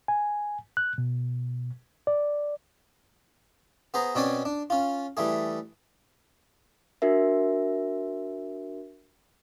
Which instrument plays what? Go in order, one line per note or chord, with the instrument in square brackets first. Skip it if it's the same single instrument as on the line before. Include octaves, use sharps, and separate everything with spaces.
[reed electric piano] G#5
F#6
B2
D5
[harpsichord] B3 G#4 C5 A#5
B2 C4 C#4 C#5 D5 G#5
D4
C#4 F4
E3 G3 A3 G#4
[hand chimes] D4 F#4 A#4 E5